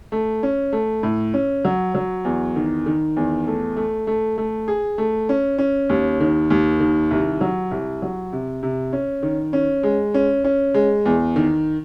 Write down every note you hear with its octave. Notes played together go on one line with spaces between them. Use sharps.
A3
C#4
A3
A2
C#4
F#3
F#3
E2
D#3
D#3
E2
A3
A3
A3
A3
G#4
A3
C#4
C#4
D#2
D#3
D#2
D#3
C2
F#3
C2
F#3
C3
C3
C#4
D#3
C#4
G#3
C#4
C#4
G#3
E2
D#3